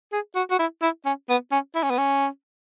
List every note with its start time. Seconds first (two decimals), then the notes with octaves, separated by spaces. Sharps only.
0.13 G#4
0.35 F#4
0.50 F#4
0.59 E4
0.82 E4
1.05 C#4
1.29 B3
1.51 C#4
1.75 E4
1.83 C#4
1.90 B3
1.98 C#4